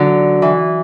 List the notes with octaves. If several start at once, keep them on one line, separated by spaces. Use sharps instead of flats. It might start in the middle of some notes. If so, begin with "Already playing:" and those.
Already playing: D3 F#3
E3